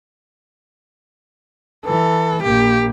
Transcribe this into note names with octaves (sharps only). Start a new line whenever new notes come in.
E3 A4
A#1 A#3 G4